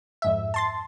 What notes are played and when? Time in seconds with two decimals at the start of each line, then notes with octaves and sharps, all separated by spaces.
0.22 F2 G#2 E5
0.54 A5 C6 A6